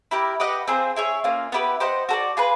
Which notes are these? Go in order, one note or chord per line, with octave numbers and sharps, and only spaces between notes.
E4 G4 A#4
G4 B4 D#5 F#5
C4 F4 G#4 C5
E4 G#4 C#5
A#3 C#4 F4
B3 E4 G4 B4
G4 C5 D#5 F#5
F#4 A4 D5
F4 G#4 B4